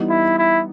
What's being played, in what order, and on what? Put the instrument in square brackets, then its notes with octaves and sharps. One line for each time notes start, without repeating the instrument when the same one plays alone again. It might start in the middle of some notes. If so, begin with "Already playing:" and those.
Already playing: [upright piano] E3 G3 B3 D#4
[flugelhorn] E4
E4